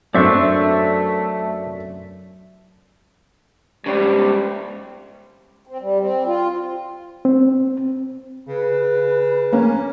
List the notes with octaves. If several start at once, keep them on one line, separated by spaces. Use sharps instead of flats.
F#2 A3 C4 D4 D5 E5 C#6
G#2 C#3 G3
C4
G3
C4
F4
C4
C#3 B4
A#3 C#4